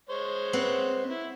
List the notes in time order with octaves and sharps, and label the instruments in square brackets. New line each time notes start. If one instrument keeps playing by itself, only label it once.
[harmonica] G#3 C5 C#5
[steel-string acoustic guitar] C4 B4 F#5
[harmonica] E4